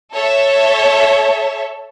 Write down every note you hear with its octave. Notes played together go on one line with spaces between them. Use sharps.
A4 C#5 E5